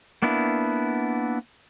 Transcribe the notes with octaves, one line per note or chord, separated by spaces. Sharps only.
A#3 B3 D4 E4